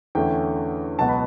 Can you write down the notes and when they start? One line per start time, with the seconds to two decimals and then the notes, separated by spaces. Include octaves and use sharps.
0.15 E2 D3 A3 C#4 E4 G5
0.99 C#2 B2 F#3 B3 A5
1.09 B5